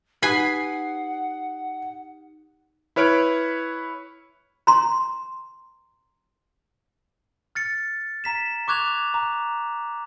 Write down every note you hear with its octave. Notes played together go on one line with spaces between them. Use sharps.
D#4 G4 B4 F#5 G#5 D#6 C7
E4 B4 C#5 F6 D7
A#5 C6
F6 A6 C#7
A#5 B6 E7
C#6 D6 F#6 G#6 F7
A#5